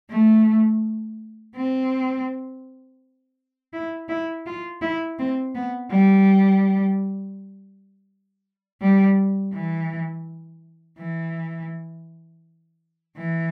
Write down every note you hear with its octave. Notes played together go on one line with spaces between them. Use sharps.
A3
C4
E4
E4
F4
E4
C4
B3
G3
G3
E3
E3
E3